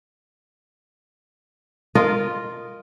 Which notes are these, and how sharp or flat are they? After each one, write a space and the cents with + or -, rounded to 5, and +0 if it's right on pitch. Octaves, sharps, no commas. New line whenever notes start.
F4 +0 A#4 +0 D#5 -5